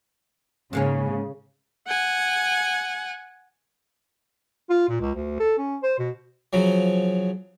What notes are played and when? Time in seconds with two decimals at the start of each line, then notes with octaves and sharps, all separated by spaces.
0.73 G#2 C#3 A#3 C#4
1.88 F#5 G#5
4.70 F4
4.89 A#2
5.00 C#2
5.14 D2
5.40 A4
5.58 C#4
5.83 C5
5.99 B2
6.53 C#3 F3 F#3